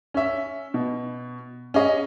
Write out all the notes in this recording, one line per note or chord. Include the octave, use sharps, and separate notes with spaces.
C#4 E5
B2
C#4 G#4 D#5